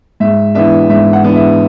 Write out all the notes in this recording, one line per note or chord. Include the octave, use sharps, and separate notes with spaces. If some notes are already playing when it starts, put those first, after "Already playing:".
G#2 E5
E3 B3 D4 E5
G#2 E5
F#5
E3 B3 D4
E5